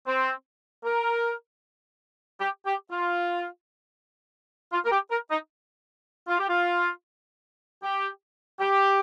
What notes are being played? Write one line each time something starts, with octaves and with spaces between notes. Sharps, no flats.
C4
A#4
G4
G4
F4
F4
A#4
G4
A#4
D#4
F4
G4
F4
G4
G4